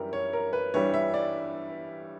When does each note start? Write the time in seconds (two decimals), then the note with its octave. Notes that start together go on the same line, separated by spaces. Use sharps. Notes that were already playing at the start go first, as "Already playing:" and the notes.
Already playing: F#2 E3 G3 G4 A#4
0.13 C#5
0.33 A#4
0.53 B4
0.74 G2 E3 G3 C#5
0.94 E5
1.14 D5